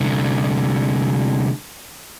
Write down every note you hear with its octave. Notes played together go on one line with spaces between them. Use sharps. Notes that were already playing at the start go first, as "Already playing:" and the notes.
C2 D3